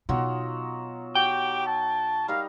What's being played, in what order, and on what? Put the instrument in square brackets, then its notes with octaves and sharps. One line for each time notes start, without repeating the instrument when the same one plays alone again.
[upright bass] B2 [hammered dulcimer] F#3 D#4 F4
[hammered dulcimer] F#4 [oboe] G4 [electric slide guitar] G5
[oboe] A5
[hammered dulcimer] G3 D#4 A#4 [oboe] F5